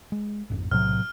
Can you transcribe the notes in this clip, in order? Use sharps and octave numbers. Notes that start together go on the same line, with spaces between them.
G#3
A1 F2 G#2
B1 A2 C3 F#3 F6